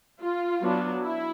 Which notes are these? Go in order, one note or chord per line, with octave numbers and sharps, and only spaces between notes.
F4
F#3 B3 D4
E4